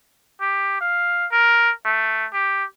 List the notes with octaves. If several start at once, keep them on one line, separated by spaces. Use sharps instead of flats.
G4
F5
A#4
A3
G4